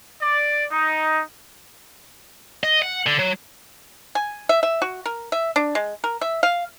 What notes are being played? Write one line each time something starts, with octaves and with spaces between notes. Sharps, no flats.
D5
D#4
D#5
F#5
D3
F#3
G#5
E5
E5
F#4
A#4
E5
D4
G#3
A#4
E5
F5